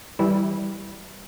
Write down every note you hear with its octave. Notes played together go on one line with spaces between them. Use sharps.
E3 G3 E4